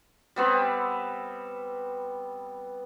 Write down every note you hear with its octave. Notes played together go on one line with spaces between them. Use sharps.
G3 B3 C4